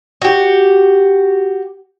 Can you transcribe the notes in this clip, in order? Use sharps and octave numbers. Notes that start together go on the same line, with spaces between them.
F#4 G4